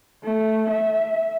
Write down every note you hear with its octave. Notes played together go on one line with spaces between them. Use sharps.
A3
E5